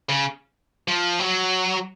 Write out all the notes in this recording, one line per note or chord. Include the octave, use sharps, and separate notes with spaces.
C#3
F3
F#3